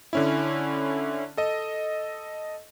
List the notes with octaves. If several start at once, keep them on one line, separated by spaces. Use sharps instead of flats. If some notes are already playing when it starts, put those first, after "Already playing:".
D3 C#4 E4
A4 D#5